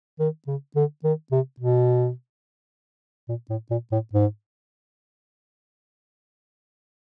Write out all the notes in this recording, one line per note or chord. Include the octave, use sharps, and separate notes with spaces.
D#3
C#3
D3
D#3
C3
B2
A#2
A2
A#2
A2
G#2